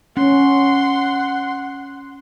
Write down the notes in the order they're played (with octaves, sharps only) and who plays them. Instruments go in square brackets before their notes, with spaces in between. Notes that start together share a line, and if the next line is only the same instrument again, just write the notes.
[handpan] C#4 [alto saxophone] F#5 [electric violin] C6